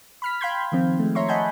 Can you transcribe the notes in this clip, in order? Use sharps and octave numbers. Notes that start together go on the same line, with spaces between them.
B5 F6 B6
F5 G5 B5 C6 G6 G#6
D#3 F3 C4
G#3 A3
C#5 E5 A#5 C6 C#6
D#5 F#5 G#5 A5 B5 G6